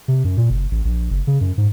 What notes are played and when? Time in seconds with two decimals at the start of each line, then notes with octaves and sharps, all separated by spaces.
0.08 C3
0.24 F#2
0.37 A#2
0.50 F#1
0.71 A1
0.85 A#1
1.10 F#1
1.27 C#3
1.41 F#2
1.58 G#2